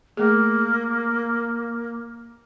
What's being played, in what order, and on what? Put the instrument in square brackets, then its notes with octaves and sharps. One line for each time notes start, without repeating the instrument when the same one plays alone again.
[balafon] A3 G#4 [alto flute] A#3